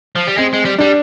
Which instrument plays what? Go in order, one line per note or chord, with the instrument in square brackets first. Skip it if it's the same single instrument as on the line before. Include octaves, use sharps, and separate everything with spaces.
[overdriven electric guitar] F3
G3
[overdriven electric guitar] G#3 [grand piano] C4
[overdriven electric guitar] G#3
G3
[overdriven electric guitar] G3 [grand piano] D4